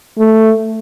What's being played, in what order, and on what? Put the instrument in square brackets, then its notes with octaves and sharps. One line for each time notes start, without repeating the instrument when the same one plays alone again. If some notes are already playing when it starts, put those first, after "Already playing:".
[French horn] A3